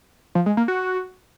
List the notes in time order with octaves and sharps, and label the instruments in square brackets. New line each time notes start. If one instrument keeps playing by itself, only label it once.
[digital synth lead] F3
G#3
A#3
F#4